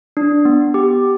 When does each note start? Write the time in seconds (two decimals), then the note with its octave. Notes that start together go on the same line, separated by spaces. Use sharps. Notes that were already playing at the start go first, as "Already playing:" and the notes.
0.17 D4
0.45 B3
0.74 G4